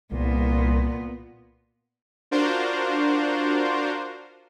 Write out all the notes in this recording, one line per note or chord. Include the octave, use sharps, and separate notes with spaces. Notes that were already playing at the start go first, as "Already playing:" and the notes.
C2 A#2 B3
D4 F4 F#4 A#4 C5